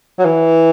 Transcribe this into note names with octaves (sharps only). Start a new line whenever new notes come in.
F#3
E3